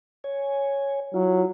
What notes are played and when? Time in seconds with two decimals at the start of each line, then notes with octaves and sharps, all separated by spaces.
0.24 C#5 G#5
1.14 F#3 E4 F4